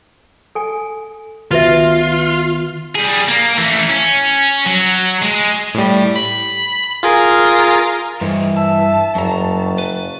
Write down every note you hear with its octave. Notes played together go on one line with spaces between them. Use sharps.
A4 G#5
D#3 B3 F4 F#4 B4 E5
G3 G#4
A#3
E3 A3
C#4
F#3
G#3
A2 G3
B5
F4 G#4 A#4
G2 E3 A#4 C5 D#5
E5 A5
F#1 F#2 A#5 C#6
B4